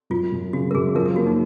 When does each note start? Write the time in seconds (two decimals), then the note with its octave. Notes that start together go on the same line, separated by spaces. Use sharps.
0.10 F#2 F4
0.32 F#2
0.53 C#3 F#4
0.71 A#4
0.74 F#2 G#4
0.95 F3 A#4
1.06 A#4
1.16 A#3 F#4
1.27 D#4